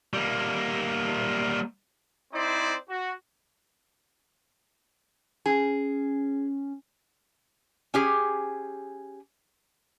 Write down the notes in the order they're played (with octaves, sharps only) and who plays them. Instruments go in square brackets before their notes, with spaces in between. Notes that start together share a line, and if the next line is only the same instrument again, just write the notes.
[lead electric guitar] G3 A#3
[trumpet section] C4 D#4 E4 C5 D5
F#4
[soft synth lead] C#4 [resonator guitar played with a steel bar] G#4
[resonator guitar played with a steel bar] C#4 G4 G#4